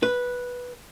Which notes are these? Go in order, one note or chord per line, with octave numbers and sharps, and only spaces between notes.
B4